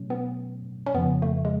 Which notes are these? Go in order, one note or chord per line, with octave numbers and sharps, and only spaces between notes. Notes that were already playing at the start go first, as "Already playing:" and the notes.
Already playing: B2 F#3 A3 C#4
B3
C#4
F2 C#3 F3 B3
A3
G#3